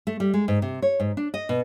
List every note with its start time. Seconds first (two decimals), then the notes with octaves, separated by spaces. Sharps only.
0.07 A3
0.20 G3
0.34 G#3
0.48 G#2
0.62 C3
0.82 C#5
1.00 G#2
1.17 D4
1.34 D#5
1.49 B2